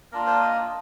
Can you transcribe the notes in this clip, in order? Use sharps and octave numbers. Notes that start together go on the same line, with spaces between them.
A#3 D4 F4 A#4
C5
D#5